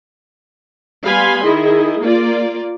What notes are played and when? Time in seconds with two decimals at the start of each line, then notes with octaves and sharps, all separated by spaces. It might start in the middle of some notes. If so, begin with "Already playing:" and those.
1.03 G3 B3 F5 G#5 B5 C6
1.44 D#3 E4 G#4 D#5
2.00 A#3 F4 D5